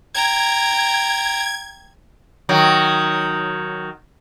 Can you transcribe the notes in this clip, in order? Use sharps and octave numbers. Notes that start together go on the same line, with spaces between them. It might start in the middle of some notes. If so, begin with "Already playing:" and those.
G5 A#5 G#6
D#3 F#3